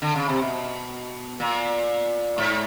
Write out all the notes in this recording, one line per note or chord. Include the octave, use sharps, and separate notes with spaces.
D3
C#3
C3
B2
A#2
G#2